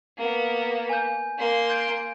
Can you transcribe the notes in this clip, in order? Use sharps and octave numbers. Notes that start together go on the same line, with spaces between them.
A#3 B3
G#5 G6
A#3 C6
G6 G#6 D7